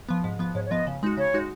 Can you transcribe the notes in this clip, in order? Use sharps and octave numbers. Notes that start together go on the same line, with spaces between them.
F3 B3
G#2
F3 B3
G#2 C#5
C#5
F3 B3 D#5
C#3
G#3 D#4 F#4
C#3 C#5
G#3 D#4 F#4